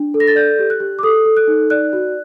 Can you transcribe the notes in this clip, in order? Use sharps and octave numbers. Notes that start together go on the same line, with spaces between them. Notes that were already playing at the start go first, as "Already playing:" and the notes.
Already playing: D4
A4
A#6
A6
D5 G6
G4
F#6
G4
D6
A4 D#6
A4
F#6
D#4
D5 F#6
F#4